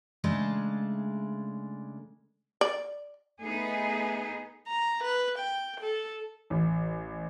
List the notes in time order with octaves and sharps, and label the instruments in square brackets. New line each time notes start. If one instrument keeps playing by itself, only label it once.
[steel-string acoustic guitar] C#3 G#3 A3 D4
[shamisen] D5
[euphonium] A3 [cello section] B3 D#4 G#4
[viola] A#5
B4
G5
A4
[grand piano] A1